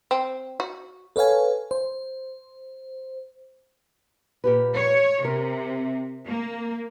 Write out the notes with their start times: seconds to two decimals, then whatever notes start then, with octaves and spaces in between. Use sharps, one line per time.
0.11 C4
0.60 F#4
1.16 A4 B4 C#5 F5 G#5
1.71 C5
4.44 A#2 G4 B4
4.75 C#5
5.25 C3 A#4
6.26 A#3